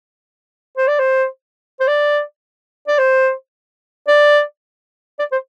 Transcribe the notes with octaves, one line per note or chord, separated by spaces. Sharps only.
C5
D5
C5
C5
D5
D5
C5
D5
D5
C5